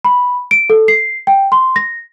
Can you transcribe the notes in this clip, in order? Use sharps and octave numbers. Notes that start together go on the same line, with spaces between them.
B5
D7
A4
C7
G5
C6
A#6